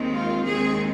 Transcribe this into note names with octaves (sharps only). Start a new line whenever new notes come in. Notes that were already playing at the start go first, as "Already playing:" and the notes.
Already playing: D#2 D#3 G#3 C4
F4
D#2 D#3 G#3 C4 G#4